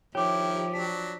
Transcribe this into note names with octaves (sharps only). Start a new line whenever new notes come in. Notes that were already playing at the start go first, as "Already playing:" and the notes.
D#3 F3 E4 G4 C#5 D6
F#3 D4 B6